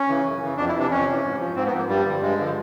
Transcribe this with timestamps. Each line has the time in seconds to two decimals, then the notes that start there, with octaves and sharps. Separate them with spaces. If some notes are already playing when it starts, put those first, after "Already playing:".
Already playing: C#4
0.08 C#3 E3
0.25 F#2
0.41 C#3 E3
0.57 F2 D4
0.69 E4
0.74 C3 E3
0.80 D4
0.91 F2 C#4
1.07 C3 E3
1.24 G#2
1.40 F3
1.56 G#2 C4
1.66 B3
1.72 F3
1.78 A#3
1.89 G2 G3
2.05 D3 F3
2.21 G2 G#3
2.37 D3 F3